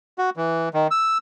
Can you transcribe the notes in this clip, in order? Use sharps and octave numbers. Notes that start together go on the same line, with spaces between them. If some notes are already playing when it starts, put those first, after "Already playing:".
F#4
E3
D#3
E6